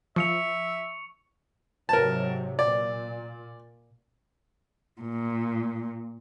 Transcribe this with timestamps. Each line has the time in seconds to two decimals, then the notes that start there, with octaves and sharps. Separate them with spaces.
0.16 F3 E5 C#6 C#7 F7
1.89 G#2 C3 F#3 A#4 A5
2.59 A#2 D5
5.01 A#2